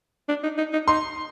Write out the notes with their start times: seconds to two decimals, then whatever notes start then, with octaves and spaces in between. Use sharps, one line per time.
0.29 D4
0.43 D#4
0.58 D#4
0.73 D#4
0.88 D#4 C6